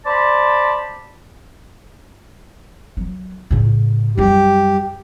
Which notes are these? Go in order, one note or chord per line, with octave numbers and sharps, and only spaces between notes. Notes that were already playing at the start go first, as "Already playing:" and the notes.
C5 D5 A5 B5
F#3
A2 C#3
F#2 G3 G4